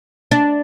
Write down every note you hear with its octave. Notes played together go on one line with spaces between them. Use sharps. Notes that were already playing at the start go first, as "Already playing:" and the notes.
D4